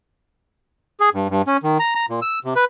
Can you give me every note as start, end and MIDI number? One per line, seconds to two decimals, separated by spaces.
1.00 1.10 68
1.14 1.27 43
1.30 1.42 43
1.47 1.57 61
1.63 1.78 51
1.79 1.95 82
1.95 2.06 82
2.09 2.20 46
2.22 2.39 88
2.44 2.54 48
2.56 2.65 71